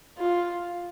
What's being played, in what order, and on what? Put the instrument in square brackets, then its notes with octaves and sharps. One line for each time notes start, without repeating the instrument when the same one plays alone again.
[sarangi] F4